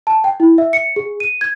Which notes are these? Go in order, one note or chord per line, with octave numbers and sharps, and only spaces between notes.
A5
G5
E4
E5
C#7
G#4
D#7
G#6